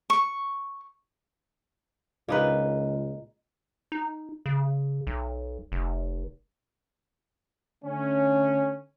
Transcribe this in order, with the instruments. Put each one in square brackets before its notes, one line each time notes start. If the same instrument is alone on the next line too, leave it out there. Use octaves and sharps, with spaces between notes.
[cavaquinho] C#6
[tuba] C#2 [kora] A#2 D#4 B4
[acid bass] D#4
C#3
B1
F1
[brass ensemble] D3 A3 C#4